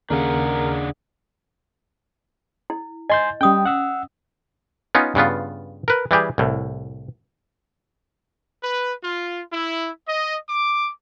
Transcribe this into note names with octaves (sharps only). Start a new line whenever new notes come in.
D#2 C#3 D4 G#4 A#4 F5 F#5
E4
D#5 G#5 C6 G6
G3 C#4 G5 D#6
F#5 E6
B3 C#4 D#4 F4
G2 C#3 B3 F4
A#4 B4
E3 G3 G4 G#4
C2 A2
B4
F4
E4
D#5
D6